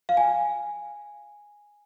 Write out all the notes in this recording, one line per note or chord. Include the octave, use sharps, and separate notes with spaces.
F5
G#5